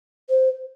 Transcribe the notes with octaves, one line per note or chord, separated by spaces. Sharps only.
C5